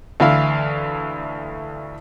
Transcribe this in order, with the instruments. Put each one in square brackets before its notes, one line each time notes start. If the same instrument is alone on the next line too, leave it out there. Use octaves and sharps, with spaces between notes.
[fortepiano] D2 E3 F5